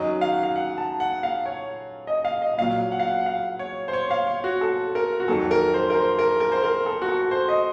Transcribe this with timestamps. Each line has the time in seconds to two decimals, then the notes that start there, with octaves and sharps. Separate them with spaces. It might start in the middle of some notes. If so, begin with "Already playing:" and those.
Already playing: F#2 D#3 F#3 D#5
0.21 F5
0.32 F#5
0.43 F5
0.56 F#5
0.78 A5
1.00 F#5
1.23 F5
1.46 C#5
2.07 D#5
2.25 F5
2.42 D#5
2.58 A#2 F#3 F5
2.92 F#5
2.99 F5
3.08 F#5
3.21 F#5
3.26 F5
3.59 C#5
3.88 C5
3.93 C#5
4.11 F5
4.27 C#5
4.44 F#4
4.61 A4
4.95 A#4
5.20 F#4
5.28 F2 D#3 F#3 A4
5.51 A#4
5.74 C5
5.90 A#4
5.95 C5
6.19 A#4
6.40 A#4
6.52 C5
6.63 A#4
6.86 A4
7.02 F#4
7.08 A4
7.31 C5
7.48 D#5